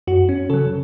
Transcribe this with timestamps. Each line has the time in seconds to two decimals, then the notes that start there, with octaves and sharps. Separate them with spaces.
0.07 F#2 F#4
0.29 C#4
0.50 C#3 F#3 A4